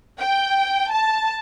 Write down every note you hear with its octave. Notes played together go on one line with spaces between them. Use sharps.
G5
A5